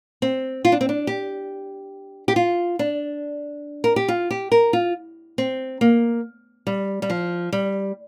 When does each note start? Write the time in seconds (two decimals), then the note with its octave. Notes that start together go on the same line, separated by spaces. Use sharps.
0.22 C4
0.65 F4
0.72 D4
0.81 C4
0.89 D4
1.07 G4
2.28 G4
2.36 F4
2.79 D4
3.84 A#4
3.96 G4
4.08 F4
4.31 G4
4.52 A#4
4.73 F4
5.38 C4
5.81 A#3
6.67 G3
7.02 G3
7.10 F3
7.52 G3